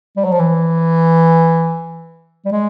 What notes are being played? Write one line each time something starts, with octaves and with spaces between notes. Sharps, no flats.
G3
F#3
F3
E3
G3
G#3